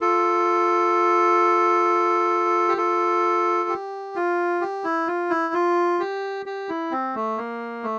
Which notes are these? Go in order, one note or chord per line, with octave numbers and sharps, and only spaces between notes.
F4 A4
G4
F4 A4
G4
F4
G4
E4
F4
E4
F4
G4
G4
E4
C4
A3
A#3
A3